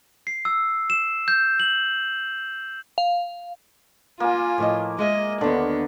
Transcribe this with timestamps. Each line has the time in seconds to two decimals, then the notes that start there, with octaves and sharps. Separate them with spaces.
0.27 C7
0.45 E6
0.90 E7
1.28 G6
1.60 F#7
2.98 F5
4.20 A#3 F4 G#5
4.58 A2 F3 D#5
4.99 G#3 G#4 D#5 E5
5.41 D#2 D3 B3 D5